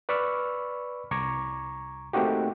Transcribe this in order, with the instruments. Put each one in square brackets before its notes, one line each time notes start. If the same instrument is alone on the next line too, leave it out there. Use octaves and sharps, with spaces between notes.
[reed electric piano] B4 D5 B5 C#6 E6 F6
C2 A#5 C#6 D6 G#6
A3 A#3 C4 D#4 F#4 G4